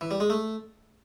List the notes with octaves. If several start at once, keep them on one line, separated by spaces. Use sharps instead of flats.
E3
G3
G#3
A3